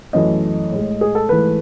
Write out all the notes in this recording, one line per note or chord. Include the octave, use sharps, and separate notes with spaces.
F#2 E3 A3 D#5
A2 G#3
G#4
A4
G#2 E3 A3 B4